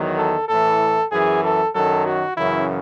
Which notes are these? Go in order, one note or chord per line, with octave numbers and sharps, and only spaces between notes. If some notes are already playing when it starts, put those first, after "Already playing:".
Already playing: E2 D#3 F#3
A4
A2 E3 A4
F#2 E3 G#4
A4
F#2 D#3 F#3 A4
F#4
F#2 C#3 E3 E4